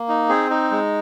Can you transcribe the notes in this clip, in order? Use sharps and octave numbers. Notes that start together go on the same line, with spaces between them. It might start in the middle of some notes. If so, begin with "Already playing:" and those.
Already playing: A#3
D#4
C4 G#4
D#4
G#3